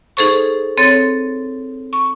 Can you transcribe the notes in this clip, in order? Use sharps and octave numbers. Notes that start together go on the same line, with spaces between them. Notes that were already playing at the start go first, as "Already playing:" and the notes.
D#4 G#4 A4 C5 C#6
C4 A4 C#5 A6
C#6